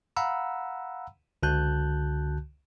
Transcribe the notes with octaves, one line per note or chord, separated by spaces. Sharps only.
F5 F#5 A#5 B5 E6
C#2 D3 F#4 A5 F#6 G6